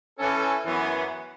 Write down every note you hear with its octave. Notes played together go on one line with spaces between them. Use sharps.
E3 C#4 A4
F#2 E3 B3